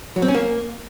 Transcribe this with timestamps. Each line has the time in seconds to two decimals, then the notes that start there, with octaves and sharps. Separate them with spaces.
0.16 F#3
0.22 C4
0.28 C#4
0.34 A#3